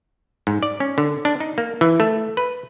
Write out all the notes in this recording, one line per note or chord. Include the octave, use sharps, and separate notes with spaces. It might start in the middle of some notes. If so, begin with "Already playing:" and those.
G#2
D5
C#4
D3
D4
D#4
A#3
E3
A3
B4